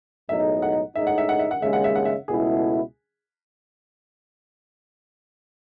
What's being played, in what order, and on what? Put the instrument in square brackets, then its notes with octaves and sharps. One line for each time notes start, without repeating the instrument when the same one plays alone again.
[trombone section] B1 A2 G#3 D#4 [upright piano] E5
[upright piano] F#5
[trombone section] A2 G#3 D#4 [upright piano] E5
[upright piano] F#5
E5
F#5
E5
F#5
[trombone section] D#2 C#3 G#3 [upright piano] E5
[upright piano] F#5
E5
F#5
E5
[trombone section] C#2 B2 A3 E4 [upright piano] G#4